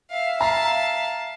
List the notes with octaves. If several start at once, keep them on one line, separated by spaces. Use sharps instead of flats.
E5 F5
F5 A5 A#5